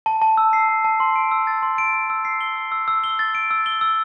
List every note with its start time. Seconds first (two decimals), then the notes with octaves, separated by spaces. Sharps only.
0.06 A5
0.22 A5
0.37 E6
0.53 C7
0.69 A5
0.85 A5
1.00 C6
1.16 D7
1.31 E6
1.47 A6
1.63 C6
1.78 D7
1.93 E6
2.10 E6
2.25 C7
2.41 G7
2.56 E6
2.72 E6
2.88 E6
3.04 G7
3.19 A6
3.35 D7
3.51 E6
3.66 G7
3.81 E6